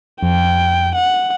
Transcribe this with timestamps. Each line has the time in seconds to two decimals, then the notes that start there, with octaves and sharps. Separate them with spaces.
0.23 F2 G5
0.95 F#5